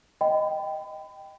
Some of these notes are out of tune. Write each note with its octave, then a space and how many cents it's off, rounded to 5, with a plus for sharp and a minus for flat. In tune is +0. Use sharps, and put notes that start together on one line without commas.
D#5 +0 G5 +0 B5 +35